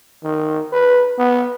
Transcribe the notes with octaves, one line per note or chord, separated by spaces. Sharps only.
D#3
B4
B3